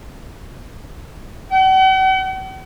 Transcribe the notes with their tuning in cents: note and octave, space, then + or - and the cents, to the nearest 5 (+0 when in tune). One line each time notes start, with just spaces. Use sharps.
F#5 +45